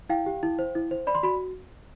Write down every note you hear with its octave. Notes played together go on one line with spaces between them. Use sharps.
E4 F5 G5
G4
E4
C5
E4
C5
D5 B5
C6
F#4 B5